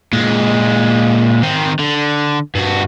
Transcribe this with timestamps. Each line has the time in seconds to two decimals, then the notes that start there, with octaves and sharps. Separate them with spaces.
0.13 A#2 G#3
1.43 D#3 C4
1.79 D3
2.55 G2 F#4